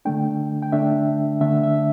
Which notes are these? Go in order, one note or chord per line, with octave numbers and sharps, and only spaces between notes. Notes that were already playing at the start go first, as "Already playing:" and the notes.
D3 A3 D4 G5
G5
D3 A3 D4 E5
D3 A3 D4 E5
E5